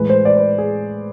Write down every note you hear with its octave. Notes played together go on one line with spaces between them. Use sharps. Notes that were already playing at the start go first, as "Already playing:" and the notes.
Already playing: A2 E3 G#3 B4
C5
D5
B4
G#4